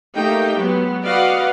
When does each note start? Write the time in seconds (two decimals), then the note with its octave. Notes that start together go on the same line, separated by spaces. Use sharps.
0.15 A3 A#3 D#4 G4 G5
0.56 F#3 G#3 B3
1.03 F#4 B4 D5 D#5 F5 F#5